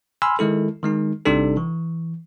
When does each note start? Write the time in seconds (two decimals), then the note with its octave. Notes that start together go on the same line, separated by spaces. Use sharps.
0.22 G#5 B5 C6 E6 F6
0.39 D#3 G#3 E4 A4
0.83 D#3 G#3 D#4
1.25 G#1 C3 G3 D4 D#4 A4
1.57 E3